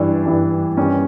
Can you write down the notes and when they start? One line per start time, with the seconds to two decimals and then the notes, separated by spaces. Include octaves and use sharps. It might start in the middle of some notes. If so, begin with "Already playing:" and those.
Already playing: G2 E3 D4
0.26 G2 E3
0.77 G2 D#3 C#4